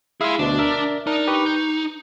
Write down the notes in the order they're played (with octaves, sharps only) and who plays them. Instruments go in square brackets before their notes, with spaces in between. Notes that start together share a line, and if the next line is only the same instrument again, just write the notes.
[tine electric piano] E4 E5 F5 [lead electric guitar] G#4 C6
[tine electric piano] D2 B2 [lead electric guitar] D4
[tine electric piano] A#4 D5 E5
[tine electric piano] D4 A#4 [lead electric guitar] D#4
[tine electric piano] G4 B4 C#6
G6